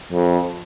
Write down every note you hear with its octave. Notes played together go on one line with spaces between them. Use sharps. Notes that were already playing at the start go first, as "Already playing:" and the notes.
F2